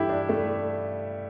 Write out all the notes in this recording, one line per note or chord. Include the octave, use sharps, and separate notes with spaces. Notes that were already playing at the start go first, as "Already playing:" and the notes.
Already playing: G2 E3 E4 G4 A4
D4
A3